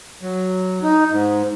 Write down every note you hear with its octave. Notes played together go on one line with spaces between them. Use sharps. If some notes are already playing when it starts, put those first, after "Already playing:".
F#3
D#4
G#2